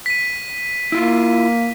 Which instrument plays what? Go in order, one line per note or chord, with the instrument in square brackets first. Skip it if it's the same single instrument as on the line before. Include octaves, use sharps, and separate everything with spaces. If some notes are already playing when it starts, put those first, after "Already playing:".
[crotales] B6 D#7
[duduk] A#3 [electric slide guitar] E4 F4